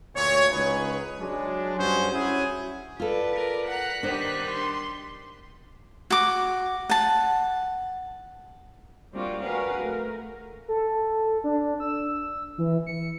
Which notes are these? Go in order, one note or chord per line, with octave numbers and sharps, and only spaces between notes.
D2 A#2 C#5
C#2 C#4 D#4 G#4 B4
F#3 G#3 D4
G2 C#4 F#4 G#4 C5
C#4 E4 F#4 G#4
F4 A4 B4 D5
A#4
F#5 A#5 F#6 B6
D#3 G3 D4 C5
C6
F#4 D6
F#5 A5
G3 A#3 C4 D4 F4 F#4
F#4 G#4 A#4 B4 F5 F#5
A3 A#4
A4
D4
E6
E3
C#7